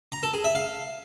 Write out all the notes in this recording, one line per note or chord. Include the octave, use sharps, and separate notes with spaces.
A#5
A4
G#4
E5
F5